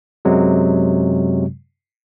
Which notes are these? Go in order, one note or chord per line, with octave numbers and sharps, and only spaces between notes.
F#2 C3 F#3 G#3